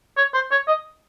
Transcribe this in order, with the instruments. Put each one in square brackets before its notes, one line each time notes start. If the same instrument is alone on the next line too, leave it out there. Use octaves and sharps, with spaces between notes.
[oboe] C#5
C5
C#5
D#5